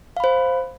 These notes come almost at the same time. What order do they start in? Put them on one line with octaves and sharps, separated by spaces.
F5 B5 C5